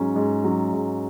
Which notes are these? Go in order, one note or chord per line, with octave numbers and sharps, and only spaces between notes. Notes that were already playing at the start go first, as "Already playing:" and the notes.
Already playing: G#2 F#3 C#4
G#2
F#3 C#4
G#2